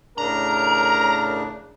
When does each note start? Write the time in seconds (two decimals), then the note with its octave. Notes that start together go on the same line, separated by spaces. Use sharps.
0.18 A2 C#3 D4 A#4 A#5